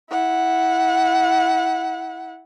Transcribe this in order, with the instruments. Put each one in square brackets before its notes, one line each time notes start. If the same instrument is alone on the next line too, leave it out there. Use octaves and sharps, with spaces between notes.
[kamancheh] E4 F#5